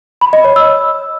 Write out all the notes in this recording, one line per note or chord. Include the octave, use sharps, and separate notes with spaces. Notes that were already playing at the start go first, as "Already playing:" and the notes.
B5
D#5
C#5
E6